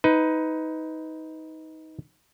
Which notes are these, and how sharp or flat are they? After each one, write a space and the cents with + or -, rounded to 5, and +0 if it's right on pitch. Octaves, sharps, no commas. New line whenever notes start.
D#4 +20 B4 +20